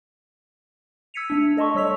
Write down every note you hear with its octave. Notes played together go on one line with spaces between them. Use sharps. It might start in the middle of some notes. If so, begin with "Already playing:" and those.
E6 G#6 B6 C#7 D#7 F7
A3 D4
A4 D#5 A5 C6 C#6
G3 C#5 E6 B6 F7